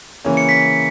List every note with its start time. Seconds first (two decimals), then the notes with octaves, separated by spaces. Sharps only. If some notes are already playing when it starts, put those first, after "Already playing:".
0.24 C#3 E3 A#3 C#4
0.37 C#7
0.49 B6